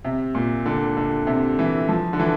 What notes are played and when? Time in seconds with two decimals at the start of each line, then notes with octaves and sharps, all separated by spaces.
0.05 C3
0.35 A#2
0.66 D3
0.97 D3
1.27 C3
1.59 E3
1.89 F3
2.13 D3
2.19 E3